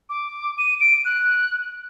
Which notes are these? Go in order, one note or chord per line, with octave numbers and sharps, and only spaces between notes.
D6
D#7
D7
F#6